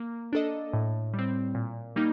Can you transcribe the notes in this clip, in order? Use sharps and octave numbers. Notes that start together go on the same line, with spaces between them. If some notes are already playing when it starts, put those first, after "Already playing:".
Already playing: A#3
D4 A4 D#5
A2
G3
C4
A#2
G3 A#3 D#4